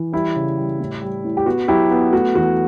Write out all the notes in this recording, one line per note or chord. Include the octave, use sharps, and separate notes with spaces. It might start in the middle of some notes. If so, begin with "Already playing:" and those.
Already playing: E3
G3 E4
C#3
G3
A2
G3
A2
G4
B3 F#4
F#3 E4 G4
B3
A3 F#4
E2 F#4